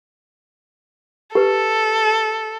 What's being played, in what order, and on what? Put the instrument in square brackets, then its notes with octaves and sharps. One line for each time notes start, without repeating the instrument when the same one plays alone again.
[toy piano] G4 B4 [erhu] A4